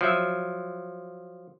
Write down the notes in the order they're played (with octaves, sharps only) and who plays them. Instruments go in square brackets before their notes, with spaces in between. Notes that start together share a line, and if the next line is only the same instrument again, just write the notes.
[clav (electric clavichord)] F3 F#3 E5